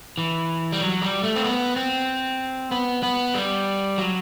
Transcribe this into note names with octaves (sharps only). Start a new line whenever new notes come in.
E3
G3
F#3
G3
A3
C4
B3
C4
B3
B3
G3
F#3